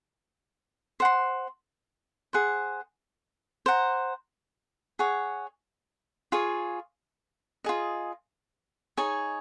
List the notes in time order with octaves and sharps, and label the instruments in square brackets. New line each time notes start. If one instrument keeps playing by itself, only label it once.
[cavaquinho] C5 F#5 C6
G#4 C5 F#5
C5 F#5 A#5
G#4 C#5 F#5
F4 G#4 C#5
F4 G#4 D#5
D#4 G#4 C#5 G#5